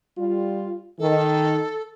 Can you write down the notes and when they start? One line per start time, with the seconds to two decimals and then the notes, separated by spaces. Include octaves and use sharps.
0.17 G3 F4
0.99 D#3 A4